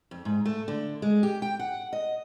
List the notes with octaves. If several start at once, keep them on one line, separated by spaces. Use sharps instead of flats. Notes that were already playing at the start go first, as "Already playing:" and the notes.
F2
G#2
A3
D3
G#3
G4
G5
F#5
D#5